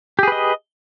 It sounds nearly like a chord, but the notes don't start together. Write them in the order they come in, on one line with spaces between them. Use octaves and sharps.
G4 G#4 B4 D#5